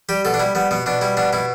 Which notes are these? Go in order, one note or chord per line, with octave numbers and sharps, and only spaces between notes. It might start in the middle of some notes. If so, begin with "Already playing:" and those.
G3 G4
B2 A4
D4
G3 E4
G3 B3
B2 B3
B2 D4
G3 E4
B2 D4
B2 E4